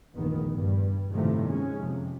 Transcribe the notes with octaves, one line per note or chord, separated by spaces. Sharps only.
F1 A#1 E2 D#3 B3
G2 G3
A2 C3 D#3 F3 G3 A3
G#3 C#4
F2 C3